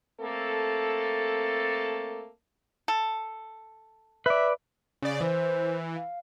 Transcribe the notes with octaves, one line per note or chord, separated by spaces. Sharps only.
A3 A#3 C4 A4
A4
B4 D5 E5
C#3 D5
E3 C5
F5